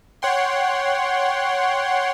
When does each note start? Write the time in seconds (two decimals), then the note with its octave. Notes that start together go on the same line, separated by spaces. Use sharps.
0.22 C#5 F#5 G5 C6